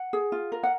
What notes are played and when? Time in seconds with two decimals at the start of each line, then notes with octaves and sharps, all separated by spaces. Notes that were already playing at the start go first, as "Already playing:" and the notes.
Already playing: F#5
0.13 G#4
0.32 F4
0.52 A#4
0.63 F#5